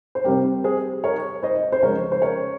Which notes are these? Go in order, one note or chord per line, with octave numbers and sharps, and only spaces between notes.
C5
C3 G3 C4 G4 A#4
G#4 C5
A#4 C#5
C5 D#5
C5
C#3 F3 G#3 C#4 A#4 C#5
C5
A#4 C#5